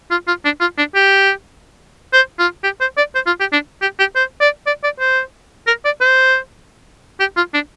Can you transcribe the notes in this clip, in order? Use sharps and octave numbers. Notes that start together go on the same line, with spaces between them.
F4
F4
D4
F4
D4
G4
C5
F4
G4
C5
D5
C5
F4
G4
D4
G4
G4
C5
D5
D5
D5
C5
A#4
D5
C5
G4
F4
D4